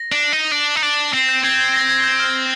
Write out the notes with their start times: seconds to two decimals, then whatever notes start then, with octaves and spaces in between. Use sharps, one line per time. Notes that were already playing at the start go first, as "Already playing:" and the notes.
Already playing: A#6
0.12 D4
0.33 D#4
0.52 D4
0.76 D#4
0.83 D4
1.13 C4 C7
1.29 G6
1.43 C4 G#6
1.53 G6
1.58 G#6
1.73 A#6
1.89 G#6
2.04 G6
2.20 F6